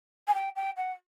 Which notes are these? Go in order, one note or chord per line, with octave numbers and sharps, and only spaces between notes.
G#5
G5
G5
F#5